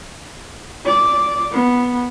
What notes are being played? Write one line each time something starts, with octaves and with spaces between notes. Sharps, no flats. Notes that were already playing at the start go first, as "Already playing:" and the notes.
D5
B3